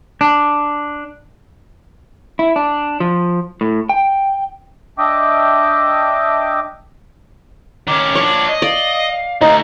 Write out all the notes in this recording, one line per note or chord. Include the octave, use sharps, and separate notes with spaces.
D4
E4
D4
F3
A2
G5
D4 D#5 E5 G5 D6
D#3 C#4 D6
F3 D4 C#5
D#5
D5 F5
D2 D#4